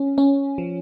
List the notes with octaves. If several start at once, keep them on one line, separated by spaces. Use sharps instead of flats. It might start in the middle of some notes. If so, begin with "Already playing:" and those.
Already playing: C#4
C#4
F3